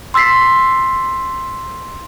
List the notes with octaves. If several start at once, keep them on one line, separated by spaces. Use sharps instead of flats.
C6 E6 A6 B6 C7